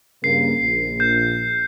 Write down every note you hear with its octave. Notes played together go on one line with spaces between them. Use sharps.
G2 C#3 A#3 C7
A#1
G6